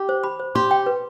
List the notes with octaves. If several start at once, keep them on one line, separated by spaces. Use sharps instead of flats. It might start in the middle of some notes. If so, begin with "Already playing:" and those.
Already playing: G4
C5
B5
C5
G4 C6
G5
B4